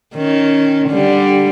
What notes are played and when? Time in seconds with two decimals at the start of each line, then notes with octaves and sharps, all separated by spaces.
0.15 D#3 C#4
0.89 D3 G3